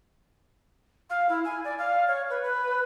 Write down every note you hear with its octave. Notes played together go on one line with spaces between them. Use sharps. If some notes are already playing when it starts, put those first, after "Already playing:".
F5
E4
G#5
D5
F5
C#5
B4
B4